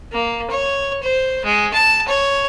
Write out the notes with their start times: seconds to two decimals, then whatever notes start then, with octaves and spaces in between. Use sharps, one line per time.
0.13 A#3
0.50 C#5
1.03 C5
1.45 G#3
1.74 A5
2.08 C#5